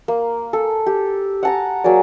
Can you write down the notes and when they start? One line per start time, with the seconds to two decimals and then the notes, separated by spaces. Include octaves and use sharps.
0.08 A#3
0.53 A4
0.86 G4
1.43 F#5 A5 A#5
1.84 F#3 A#3 G#4 D5